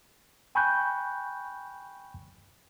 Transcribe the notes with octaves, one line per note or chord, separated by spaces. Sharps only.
G5 G#5 B5 C#6 F#6 G6